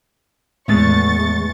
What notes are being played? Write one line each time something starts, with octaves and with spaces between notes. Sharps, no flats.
E2 A2 G#3 A3 C#6 A6